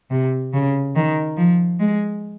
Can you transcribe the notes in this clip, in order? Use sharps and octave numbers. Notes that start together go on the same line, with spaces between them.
C3
C#3
D#3
F3
G#3